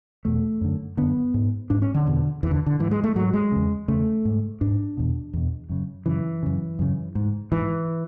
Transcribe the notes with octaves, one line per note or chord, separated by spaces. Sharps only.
E2 B2 A3
F#2 D3
F#2 D3 B3
G#2
G#2 D4
C#4
D3
E2 B2
E2 B2 E3
D3
D3
G#2 E3
G#3
A3
G#2 F#3
G#3
E2 C#3
E2 C#3 A3
G#2
G#2 D4
E2 B2
E2 B2
F#2 C#3
F#2 C#3 E3
F#2 C#3
F#2 C#3
G#2
G#2 E3